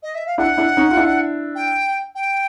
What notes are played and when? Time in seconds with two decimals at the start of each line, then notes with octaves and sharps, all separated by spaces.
0.03 D#5
0.15 E5
0.27 F5
0.38 D4 E4 F#5
0.57 D4 E4
0.77 C#4 D#4
0.91 F4
0.97 D4 E4
1.55 G5
2.15 G5